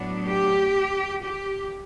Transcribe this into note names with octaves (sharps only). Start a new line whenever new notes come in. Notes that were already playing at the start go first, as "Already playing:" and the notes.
Already playing: A2 F#3 B3 D4
G4
G4